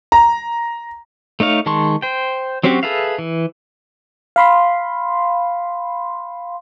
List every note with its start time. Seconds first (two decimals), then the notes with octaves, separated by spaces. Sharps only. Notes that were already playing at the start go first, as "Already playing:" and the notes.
0.12 A#5
1.40 A3 D#4 C#5 F5
1.66 D#3 G#3 A5 C6 C#6
2.02 C5 G5
2.64 F#3 C4 C#4 F#4 G4
2.83 G#4 A4 B4 E5 F5
3.18 E3
4.36 F5 B5 C6